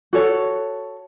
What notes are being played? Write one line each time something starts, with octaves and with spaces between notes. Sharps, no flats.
F#4 A4 C#5